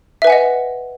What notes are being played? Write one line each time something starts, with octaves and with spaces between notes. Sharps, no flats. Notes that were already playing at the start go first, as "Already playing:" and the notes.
B4 D#5 E5 F#5 G#5